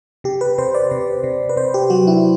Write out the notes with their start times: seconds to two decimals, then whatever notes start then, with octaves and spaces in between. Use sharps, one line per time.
0.24 C3 G4
0.41 B4
0.58 C3 C5
0.75 D5
0.91 C3
1.24 C3
1.49 B4
1.57 C3 C5
1.74 G4
1.90 F#3 F#4
2.07 E4